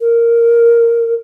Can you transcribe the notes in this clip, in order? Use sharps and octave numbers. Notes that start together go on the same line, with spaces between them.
A#4